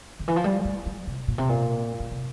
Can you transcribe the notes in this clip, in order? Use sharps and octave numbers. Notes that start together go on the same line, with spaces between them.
D3
E3
F3
G3
A3
G3
C3
A#2
C3
A#2
A#2
C3